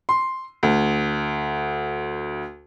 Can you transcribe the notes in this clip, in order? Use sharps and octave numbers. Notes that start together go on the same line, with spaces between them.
C6
D2